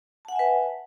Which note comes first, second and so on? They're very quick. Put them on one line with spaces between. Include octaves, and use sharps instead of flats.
A5 F#5 G#5 E5 B4